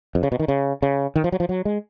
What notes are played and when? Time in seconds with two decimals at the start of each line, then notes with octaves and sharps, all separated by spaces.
0.15 F2
0.23 C#3
0.32 B2
0.39 D#3
0.48 C#3
0.82 C#3
1.16 D#3
1.24 F3
1.32 F#3
1.40 F3
1.49 F#3
1.65 G#3